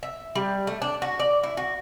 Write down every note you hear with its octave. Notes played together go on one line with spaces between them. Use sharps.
E5
G3
A3
D4
F#4
D5
E4
F#4